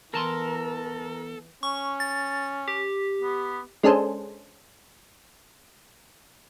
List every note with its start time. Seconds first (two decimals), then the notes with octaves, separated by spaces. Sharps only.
0.14 E2 E3 A4 A#4 A5 C6
1.63 C#4 C#6
2.00 A6
2.68 G4
3.22 B3
3.83 G#3 C#4 D4 G#4 A4 C5